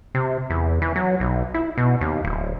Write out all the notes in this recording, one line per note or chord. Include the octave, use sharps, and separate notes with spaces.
C3
E2
E3
F#3
B1
E4
B2
D#2
D1